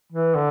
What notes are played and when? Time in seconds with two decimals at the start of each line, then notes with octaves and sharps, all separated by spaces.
0.13 E3
0.35 D3